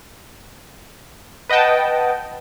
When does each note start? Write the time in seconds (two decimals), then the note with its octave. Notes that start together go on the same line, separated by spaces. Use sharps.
1.49 B4 D#5 F#5 G5 A5